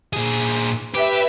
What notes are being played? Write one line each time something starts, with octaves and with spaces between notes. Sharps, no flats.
A#2 G#4
G4 B4 E5